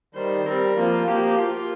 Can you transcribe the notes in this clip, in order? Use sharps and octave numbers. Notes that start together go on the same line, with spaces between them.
D#3 G3 C5
G3 C4 A#4
F3 A#3 F4
F3 A#3 G4
F4